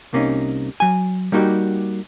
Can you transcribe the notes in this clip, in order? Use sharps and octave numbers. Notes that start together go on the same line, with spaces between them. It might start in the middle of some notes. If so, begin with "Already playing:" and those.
C2 C3 A#3 C#4 D#4
F#3 G#5
G3 A#3 D#4 F#4 G4